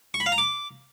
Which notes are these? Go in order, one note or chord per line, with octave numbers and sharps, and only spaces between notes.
C#6
B5
F5
A#5
D6